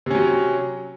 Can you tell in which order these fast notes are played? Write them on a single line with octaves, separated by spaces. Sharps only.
C3 C#4 F#3